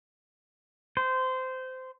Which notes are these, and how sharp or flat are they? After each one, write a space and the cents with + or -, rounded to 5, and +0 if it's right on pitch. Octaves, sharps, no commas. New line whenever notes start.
C5 -20